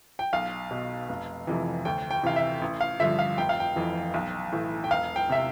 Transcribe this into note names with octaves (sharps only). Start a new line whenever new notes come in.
G5
B1 F5
B2
F1
F2 C3 E3
D2 G5
G5
C3 E3 F5
E5
A1
F5
G2 D3 F3 E5
F5
F1 G5
F5
G5
F2 E3
B1
A2 E3
G5
E1 F5
G5
C3 E5